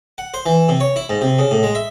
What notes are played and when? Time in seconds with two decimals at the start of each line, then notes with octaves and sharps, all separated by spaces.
0.18 F#5
0.34 C5
0.46 E3
0.68 C3
0.80 C#5
0.96 E4
1.09 G#2
1.21 C3
1.39 C#3
1.51 A2
1.63 G#3
1.75 E5